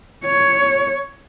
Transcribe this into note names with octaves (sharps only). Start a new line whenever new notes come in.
C#5